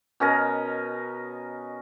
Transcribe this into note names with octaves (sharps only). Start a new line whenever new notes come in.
B2 C#4 A#4 D#5